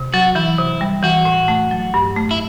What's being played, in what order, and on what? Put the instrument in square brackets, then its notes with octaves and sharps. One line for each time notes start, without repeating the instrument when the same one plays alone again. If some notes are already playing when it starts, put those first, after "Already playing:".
Already playing: [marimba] C3
[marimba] F#3 [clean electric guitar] F#4
[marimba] E3 [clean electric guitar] E4
[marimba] C3
G3
[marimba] E3 [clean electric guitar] F#4
[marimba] A2
A3
F#3
G2
A3
[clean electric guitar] E4